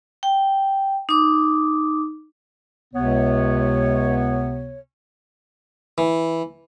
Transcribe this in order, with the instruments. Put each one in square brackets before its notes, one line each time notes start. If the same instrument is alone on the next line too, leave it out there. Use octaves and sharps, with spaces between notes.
[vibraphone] G5
D#4 D6
[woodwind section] C#2 C3 B3 C#5
[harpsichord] E3